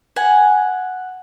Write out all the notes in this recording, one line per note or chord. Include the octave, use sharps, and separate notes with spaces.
F#5 G#5